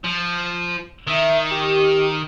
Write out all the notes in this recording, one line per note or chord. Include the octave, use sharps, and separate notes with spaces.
F3
D#3 E5
G4